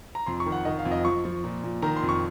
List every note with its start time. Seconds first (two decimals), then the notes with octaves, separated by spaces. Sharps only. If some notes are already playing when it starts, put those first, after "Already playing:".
0.15 A#5
0.26 F2 C6
0.40 C#6
0.46 D#3
0.52 F#5
0.65 D#3 D#5
0.79 F5
0.85 F2
0.92 D#5
1.05 F3 C#6
1.25 F3
1.44 A#2
1.63 A#2
1.82 D#3 A#5
1.96 C6
2.03 F2
2.09 C#6